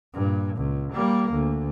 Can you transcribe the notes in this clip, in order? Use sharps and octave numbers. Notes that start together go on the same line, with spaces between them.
G2 A#2
C#2
G3 A#3
D2